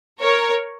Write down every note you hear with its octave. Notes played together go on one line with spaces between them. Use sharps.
A#4 C#5